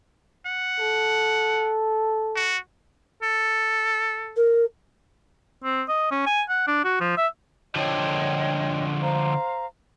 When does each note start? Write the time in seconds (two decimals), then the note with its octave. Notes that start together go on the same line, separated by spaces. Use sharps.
0.46 F#5
0.80 A4
2.35 F#4
3.23 A4
4.36 A#4
5.64 C4
5.88 D#5
6.11 C#4
6.26 G#5
6.49 F#5
6.67 D4
6.84 F#4
7.00 F3
7.17 E5
7.75 D3 F3 C#5 D#5 G5
9.01 C5 F5 A#5